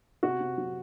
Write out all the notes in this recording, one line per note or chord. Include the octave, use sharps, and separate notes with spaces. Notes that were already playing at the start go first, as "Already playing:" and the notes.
C3 F#4
C3
F#3